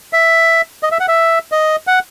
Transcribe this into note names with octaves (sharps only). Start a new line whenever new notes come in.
E5
D#5
E5
F#5
E5
D#5
F#5